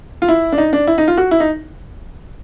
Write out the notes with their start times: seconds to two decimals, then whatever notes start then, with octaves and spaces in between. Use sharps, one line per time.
0.22 F4
0.28 E4
0.52 D4
0.58 D#4
0.73 D4
0.87 E4
0.98 D#4
1.08 F4
1.18 F#4
1.31 E4
1.40 D#4